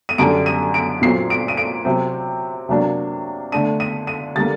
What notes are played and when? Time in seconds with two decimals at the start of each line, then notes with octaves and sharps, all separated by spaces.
0.09 D#7
0.18 F#2 D3 G3 D4 D7
0.46 D#7
0.74 D7
1.02 A#2 F#3 C4 C7
1.30 D7
1.48 D#7
1.57 D7
1.85 C3 F#3 C4
2.69 C3 F#3 A#3 D4
3.52 D3 A3 D4 D#7
3.80 D#7
4.07 D#7
4.35 D3 G3 A#3 A6